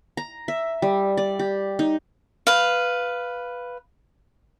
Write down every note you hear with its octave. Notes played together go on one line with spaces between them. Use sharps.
A#5
E5
G3
D5
G4
D#4
B4 F5